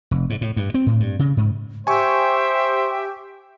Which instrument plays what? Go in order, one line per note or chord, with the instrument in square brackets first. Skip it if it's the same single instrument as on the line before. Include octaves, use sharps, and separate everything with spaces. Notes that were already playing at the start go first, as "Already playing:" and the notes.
[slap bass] F1
G#2
A2
G2
C4
A2
G2
C#3
G#2
[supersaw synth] G4 [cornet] C5 [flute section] E5 G5 [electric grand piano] G#5 C#6